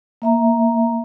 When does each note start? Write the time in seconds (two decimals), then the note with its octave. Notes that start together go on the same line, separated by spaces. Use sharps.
0.22 A#3 E5 A#5